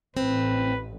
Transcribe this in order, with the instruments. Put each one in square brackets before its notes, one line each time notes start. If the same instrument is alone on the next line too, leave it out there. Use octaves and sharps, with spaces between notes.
[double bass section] A1 [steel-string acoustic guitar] C4 [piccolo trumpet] B4